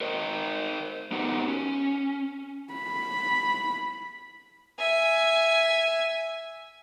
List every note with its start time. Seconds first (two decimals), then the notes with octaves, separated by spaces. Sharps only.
0.01 A#4 C5 D#5
1.12 B3 D#4 F#4 G4 A#4
1.48 C#4
2.74 B5
4.79 E5 G#5